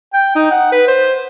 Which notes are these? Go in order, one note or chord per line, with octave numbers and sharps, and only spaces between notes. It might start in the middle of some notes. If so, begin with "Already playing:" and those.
G5
D#4
F#5
B4
C5